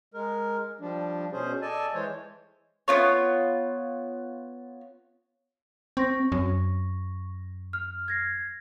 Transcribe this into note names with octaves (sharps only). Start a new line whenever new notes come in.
G#3 A#4
F3 G3 D4
B2 C#4 G#4 C5
A4 D5 D#5 G#5 A5
E3 G#3 C5 C#5
B3 D4 F4 C#5
C4 C#6 A#6
F#2
F6
G#6 A#6 C7